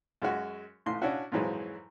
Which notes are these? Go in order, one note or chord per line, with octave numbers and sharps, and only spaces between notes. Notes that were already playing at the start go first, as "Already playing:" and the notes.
F#2 G#3 F#4
A1 A2 C6
C#4 D4 E4 F#4
F2 G#2 E3 F#3 G#3